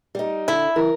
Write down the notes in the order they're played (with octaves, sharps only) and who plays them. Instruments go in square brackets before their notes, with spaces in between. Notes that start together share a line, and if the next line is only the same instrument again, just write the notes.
[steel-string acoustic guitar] G3 D#4
[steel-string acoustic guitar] D3 [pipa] E4
[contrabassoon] E3 [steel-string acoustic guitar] A#4